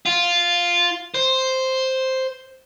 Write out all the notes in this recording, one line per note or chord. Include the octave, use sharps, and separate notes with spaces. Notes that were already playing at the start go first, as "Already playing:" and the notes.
F4
C5